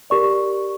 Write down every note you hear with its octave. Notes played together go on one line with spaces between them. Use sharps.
G4 A#4 D5 C#6